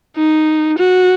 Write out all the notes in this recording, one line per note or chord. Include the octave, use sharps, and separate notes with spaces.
D#4
F#4